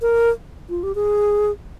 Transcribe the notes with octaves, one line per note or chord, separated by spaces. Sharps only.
A#4
F4
G4
G#4